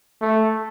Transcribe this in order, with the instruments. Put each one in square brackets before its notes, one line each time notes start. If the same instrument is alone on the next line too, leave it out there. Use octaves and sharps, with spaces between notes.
[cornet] A3